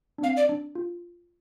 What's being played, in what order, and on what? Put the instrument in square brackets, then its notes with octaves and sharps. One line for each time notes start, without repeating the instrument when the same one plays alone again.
[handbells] D4
[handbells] C4 [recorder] F5
[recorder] D5
[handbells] D4
F4